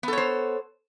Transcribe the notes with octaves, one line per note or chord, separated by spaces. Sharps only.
B3 A4 C5 C#5